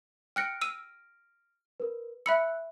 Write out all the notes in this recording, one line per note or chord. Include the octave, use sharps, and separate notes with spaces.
G5 F6 F#6 A#6 C#7 D7
E6 D#7
A#4 B4
E5 B5 E6 F#6 C#7